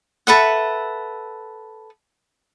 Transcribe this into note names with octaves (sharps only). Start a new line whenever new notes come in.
A4 B4 E5 F#5